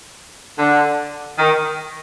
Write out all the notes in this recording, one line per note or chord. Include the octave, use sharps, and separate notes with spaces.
D3
D#3